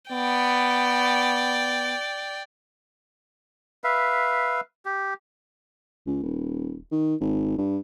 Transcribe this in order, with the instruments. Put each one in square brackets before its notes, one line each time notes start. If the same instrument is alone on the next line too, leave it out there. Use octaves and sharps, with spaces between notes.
[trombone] B3 [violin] D5 G5
[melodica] B4 E5 F5
G4
[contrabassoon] C#2
D#1
D#3
G#1
G2